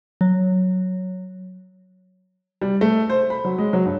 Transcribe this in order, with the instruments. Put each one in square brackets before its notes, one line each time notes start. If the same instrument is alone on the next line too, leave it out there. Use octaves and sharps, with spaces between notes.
[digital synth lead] F#3
[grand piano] G3
A3
C5
B5
F#3
G#3
F#3
G2